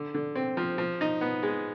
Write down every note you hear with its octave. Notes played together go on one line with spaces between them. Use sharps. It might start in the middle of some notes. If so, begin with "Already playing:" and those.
Already playing: D3
D3
C4
F3
F3
D#4
B3
G#3